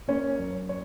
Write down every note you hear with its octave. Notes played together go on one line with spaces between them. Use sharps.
A#3 C#4 C#5
F#2
C#5